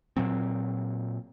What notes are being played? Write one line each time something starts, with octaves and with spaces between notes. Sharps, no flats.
A#2 F#3 C4